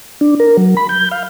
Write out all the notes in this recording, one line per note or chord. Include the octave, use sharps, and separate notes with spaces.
D4
A#4
F#3
B5
G6
F5